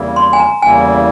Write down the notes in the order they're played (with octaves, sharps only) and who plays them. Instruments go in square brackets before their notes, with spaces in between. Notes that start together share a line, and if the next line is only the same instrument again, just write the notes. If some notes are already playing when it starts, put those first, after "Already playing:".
Already playing: [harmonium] E2 C#3 G3 A#3 E4
[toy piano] C6
G#5
A#5
[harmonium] E2 C#3 G3 A#3 E4 [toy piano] G#5